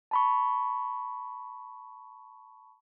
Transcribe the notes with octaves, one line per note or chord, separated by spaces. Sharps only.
A5 B5 C#6